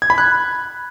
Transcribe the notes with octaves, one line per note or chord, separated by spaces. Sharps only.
G#6
B5
F#6